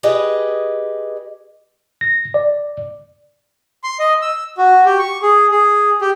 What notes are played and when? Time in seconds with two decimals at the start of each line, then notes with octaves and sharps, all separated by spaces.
0.03 G4 G#4 B4 D#5
2.01 A#6
2.34 D5
3.84 C6
3.99 D#5
4.22 E6
4.57 F#4
4.85 G4
4.99 C#6
5.22 G#4
5.51 G#4
6.01 G4